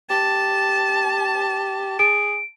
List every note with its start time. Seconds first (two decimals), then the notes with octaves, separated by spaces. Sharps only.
0.10 G4 A5
1.99 G#4 D7